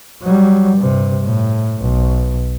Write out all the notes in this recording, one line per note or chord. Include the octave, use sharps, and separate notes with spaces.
F#3 G3
G2 C3
A2
B1